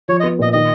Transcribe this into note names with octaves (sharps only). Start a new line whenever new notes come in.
F3 C#5
D#5
B3
A#2 D#5
D#3 D#5